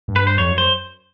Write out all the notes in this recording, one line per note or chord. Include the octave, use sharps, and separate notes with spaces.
G2
B4
C5
F2 C#5
F#2
C5